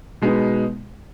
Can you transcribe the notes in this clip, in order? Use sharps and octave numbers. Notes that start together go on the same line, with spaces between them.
B2 G#3 B3 D#4